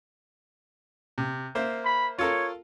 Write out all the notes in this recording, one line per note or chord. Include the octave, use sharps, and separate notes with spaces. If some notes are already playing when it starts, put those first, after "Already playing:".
C3
A#3 C5 E5
B5
F4 A4 A#4 C#5